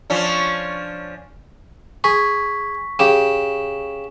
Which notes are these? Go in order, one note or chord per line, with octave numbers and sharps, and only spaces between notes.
F3 C#4 D4
G#4 C#6 B6
C#3 G4 E7